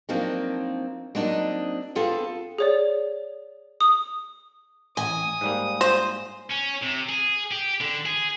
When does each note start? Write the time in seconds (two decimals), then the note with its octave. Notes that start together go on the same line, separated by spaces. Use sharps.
0.09 F3 F#3 A#3 C4 D4 D#4
1.15 F#3 A#3 C4 D4 D#4 D#5
1.95 B3 C4 F4 G#4 A4
2.58 G#4 C#5 D5
3.81 D#6
4.97 A1 G#5 D#6
5.41 G#2 G3 A#3
5.81 C5
6.50 C#4
6.82 C3
7.09 G#4
7.51 G4
7.81 D3
8.06 G#4